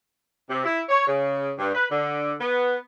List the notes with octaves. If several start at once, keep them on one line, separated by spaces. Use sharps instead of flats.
C3
E4
C#5
C#3
G2
B4
D3
B3